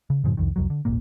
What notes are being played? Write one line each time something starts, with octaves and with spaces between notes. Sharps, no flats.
C#3
F#2 A2 C#3 F3
C2 F2 D#3
C2 F2 F#3
D3
D#1 G#1 A#2 A#3